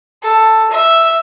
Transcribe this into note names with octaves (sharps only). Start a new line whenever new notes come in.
A4
E5